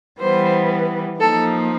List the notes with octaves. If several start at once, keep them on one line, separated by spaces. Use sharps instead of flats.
E3 G3 B3 C5
F3 A#3 D#4 A4